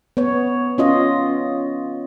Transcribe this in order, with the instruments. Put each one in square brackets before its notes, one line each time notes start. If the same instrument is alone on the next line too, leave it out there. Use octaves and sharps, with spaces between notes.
[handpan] B3 C#5
C#4 F4 D#5